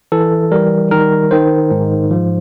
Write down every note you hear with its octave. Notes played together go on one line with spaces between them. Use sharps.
E3 A4
G3 A#4
D#3 A#4
D#3 C5
G#2
F3